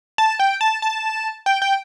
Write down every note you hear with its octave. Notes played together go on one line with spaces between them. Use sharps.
A5
G5
A5
A5
G5
G5